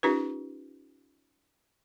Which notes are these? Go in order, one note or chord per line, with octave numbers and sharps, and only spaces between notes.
C#4 D#4 F4 G4 A#4 B4